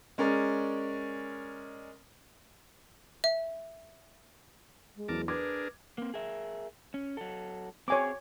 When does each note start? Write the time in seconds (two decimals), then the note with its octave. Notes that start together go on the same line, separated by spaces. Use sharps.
0.18 G#3 C#4 A#4 D5
3.24 E5
4.96 G#3
5.08 E2 E3 F#3 A#4 A5 D6
5.28 D4 G#4 A#4 B4 D6 G#6
5.98 A#3 C4
6.14 G#4 A#4 E5
6.94 C#4
7.17 F#3 A4
7.88 C4 G#4 C#5 G#5 D6